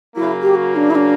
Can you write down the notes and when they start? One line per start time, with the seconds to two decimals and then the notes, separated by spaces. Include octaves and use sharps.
0.15 C#3 F#3 A#3 E4
0.41 G4
0.55 F#4
0.75 D4
0.90 E4
0.95 D4